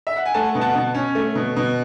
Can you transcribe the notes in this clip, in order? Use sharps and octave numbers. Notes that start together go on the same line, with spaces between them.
E5
F#5
G#5
A3 F#5 A5
B2
F#5 A5
B2
C#4
A3
B2
B2